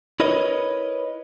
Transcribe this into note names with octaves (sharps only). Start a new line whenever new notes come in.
E4 A#4 B4 C#5 D#5